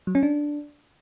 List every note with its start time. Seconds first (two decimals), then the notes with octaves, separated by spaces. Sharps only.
0.07 F#3
0.15 C#4
0.23 D4